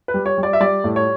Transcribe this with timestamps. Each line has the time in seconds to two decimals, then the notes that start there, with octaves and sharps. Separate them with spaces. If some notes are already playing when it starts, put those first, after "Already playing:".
0.08 B4
0.14 G3
0.26 C#5
0.38 G3
0.43 D5
0.53 E5
0.60 G3 D5
0.84 A2
0.96 C#5